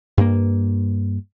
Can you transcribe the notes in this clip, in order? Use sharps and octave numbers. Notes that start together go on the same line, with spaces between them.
G2 A#3